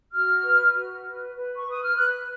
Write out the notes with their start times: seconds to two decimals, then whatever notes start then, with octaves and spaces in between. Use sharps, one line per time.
0.12 F#4 F6
0.42 B4
0.73 F#4
1.04 B4
1.34 B4
1.56 C#6
1.65 B4 D#6
1.83 F6
1.96 B4 F#6